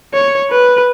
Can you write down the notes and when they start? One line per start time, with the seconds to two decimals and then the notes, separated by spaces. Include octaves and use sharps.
0.14 C#5
0.51 B4